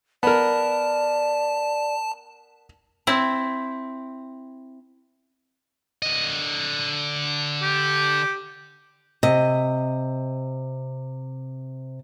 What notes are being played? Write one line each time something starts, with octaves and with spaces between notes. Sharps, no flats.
B3 A#4 D5 A5
C4 E4
D3 D#5
G4
C3 D#5